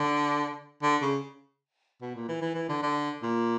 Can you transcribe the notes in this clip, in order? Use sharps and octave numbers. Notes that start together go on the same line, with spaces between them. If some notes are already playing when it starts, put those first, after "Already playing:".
Already playing: D3
D3
C#3
B2
A#2
E3
E3
E3
D3
D3
A#2